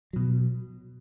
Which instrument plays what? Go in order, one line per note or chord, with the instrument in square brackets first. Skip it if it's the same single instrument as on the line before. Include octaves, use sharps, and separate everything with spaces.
[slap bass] B2 F#3